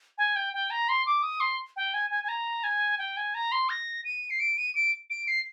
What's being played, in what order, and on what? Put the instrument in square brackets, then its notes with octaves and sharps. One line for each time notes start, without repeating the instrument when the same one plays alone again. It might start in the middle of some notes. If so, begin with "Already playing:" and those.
[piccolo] G#5
G5
G5
A#5
C6
D6
D#6
C6
G5
G#5
G#5
G#5
A#5
G#5
G5
G#5
A#5
C6
A#6
D#7
C7
D7
D#7
D7
D7
C7